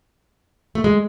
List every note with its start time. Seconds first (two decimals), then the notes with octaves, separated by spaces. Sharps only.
0.75 A3
0.84 G#3